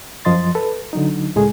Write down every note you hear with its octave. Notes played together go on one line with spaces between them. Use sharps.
F#2 F3 D#5 C6 A6
A4 B4
D3 F#3 D#4
C#2 A2 G#3 A3 G#4